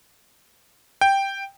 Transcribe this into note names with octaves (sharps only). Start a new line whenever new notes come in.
G5